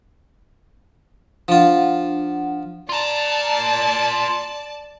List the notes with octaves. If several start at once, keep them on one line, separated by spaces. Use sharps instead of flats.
F3 D4 F4 F#5
F4 D5 A5 A#5